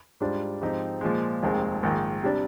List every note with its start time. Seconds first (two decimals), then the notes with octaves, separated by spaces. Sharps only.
0.20 G#2 G3 D4 F4 C5
0.61 G#2 F3 C4 D#4 G4
1.01 A#2 F3 G#3
1.43 F1 D#2 D#3 G#3 C4
1.83 A#1 G#2 D#3
2.23 C3 G3 D4